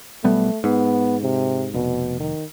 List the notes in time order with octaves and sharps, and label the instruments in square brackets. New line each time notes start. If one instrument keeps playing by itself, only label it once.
[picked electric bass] B1 G3 B3 [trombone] A3
[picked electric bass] G#2 [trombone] B3
[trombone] C3
[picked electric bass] F1 [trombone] B2
[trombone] D#3